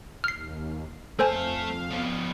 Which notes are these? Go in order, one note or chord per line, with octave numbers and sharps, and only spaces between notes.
D#2 F6 C7
F2 A3 A4 C5 F5 G#5 A5
F3 B3